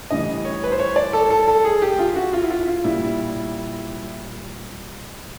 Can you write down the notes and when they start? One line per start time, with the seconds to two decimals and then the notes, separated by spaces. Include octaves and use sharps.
0.11 A2 E3 G3 D#5
0.45 C#5
0.64 B4
0.72 C5
0.79 C#5
0.96 D5
1.13 A4
1.30 A4
1.48 A4
1.64 G#4
1.82 G4
1.99 F4
2.16 F#4
2.33 F4
2.42 E4
2.50 F4
2.68 F4
2.84 A#2 G3 E4